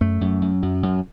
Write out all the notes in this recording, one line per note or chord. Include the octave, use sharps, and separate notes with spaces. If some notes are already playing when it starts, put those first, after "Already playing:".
F#2 A3
F#2
F#2
F#2
F#2